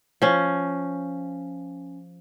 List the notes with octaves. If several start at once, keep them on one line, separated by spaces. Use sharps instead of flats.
F3 C#4